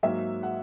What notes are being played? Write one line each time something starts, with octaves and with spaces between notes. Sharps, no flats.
G#2 F#3 A#3 E5
F#5